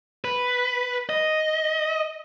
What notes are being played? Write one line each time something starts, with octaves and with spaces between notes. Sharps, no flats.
B4
D#5